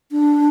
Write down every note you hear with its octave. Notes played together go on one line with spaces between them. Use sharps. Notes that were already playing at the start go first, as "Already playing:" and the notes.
D4